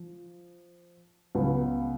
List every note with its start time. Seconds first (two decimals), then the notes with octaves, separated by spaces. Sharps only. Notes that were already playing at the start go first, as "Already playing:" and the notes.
Already playing: F3
1.35 C#2 C#3 F#3 B3